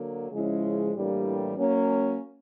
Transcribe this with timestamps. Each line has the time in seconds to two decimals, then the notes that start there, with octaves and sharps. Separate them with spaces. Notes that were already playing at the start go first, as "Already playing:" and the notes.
Already playing: D3 F#3 A#3
0.31 C#3 F3 G#3 C#4 E4
0.94 A2 E3 G3 A#3 D4
1.57 F#3 A#3 C#4